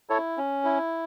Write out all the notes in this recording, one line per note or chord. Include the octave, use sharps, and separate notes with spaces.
E4 A4 C#5
C#4
E4